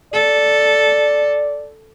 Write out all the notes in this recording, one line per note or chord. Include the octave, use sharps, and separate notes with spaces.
A4 D5